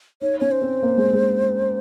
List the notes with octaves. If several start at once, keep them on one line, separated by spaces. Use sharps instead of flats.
D#4 C#5
C#4 C#5
C5
C4
A#3
G#3
G#3